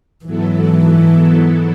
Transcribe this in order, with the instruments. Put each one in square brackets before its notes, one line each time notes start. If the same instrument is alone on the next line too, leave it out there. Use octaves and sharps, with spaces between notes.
[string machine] G#2 F#3 B3 E4 A4 [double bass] E3